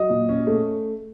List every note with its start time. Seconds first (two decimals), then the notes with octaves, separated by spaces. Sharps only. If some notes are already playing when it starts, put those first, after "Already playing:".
Already playing: F#3 D#5
0.10 A#2
0.29 C#4
0.47 A3